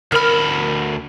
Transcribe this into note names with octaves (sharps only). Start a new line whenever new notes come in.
D2 A#4 B5 F6